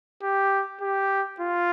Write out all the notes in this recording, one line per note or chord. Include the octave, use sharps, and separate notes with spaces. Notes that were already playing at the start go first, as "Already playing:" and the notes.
G4
G4
F4